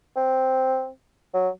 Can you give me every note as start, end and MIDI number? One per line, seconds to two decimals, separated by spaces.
0.16 0.89 60
1.34 1.49 54